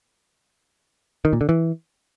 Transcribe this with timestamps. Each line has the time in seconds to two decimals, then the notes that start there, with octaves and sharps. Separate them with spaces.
1.25 D#3
1.33 A#2
1.41 D3
1.49 E3